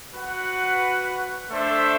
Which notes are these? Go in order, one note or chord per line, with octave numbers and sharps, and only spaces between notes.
F#4 B4 F#5
A3 D4 A4 C5 E5